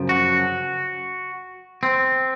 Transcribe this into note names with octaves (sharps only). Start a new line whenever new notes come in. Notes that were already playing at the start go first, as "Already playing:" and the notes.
Already playing: F#2 C#3 F3
F#4
C4